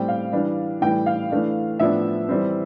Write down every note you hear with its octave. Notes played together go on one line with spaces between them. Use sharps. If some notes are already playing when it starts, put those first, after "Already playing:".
Already playing: A2 G3 C4 G5
F5
E3 G3 D4
A2 E3 G3 G5
F5
E3 A3 D4
A2 F3 B3 D4 E5
E3 G3 C4